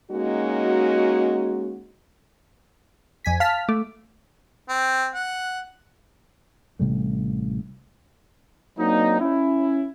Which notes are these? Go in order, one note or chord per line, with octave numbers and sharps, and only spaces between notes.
G#3 A#3 C#4 D#4 F#4
F2 G#5 B6
F5 A5 F6 B6
A3 D6
C4
F#5
A1 C3 G3 A3
F#3 A#3 C4 D4 D#4
C#4 E4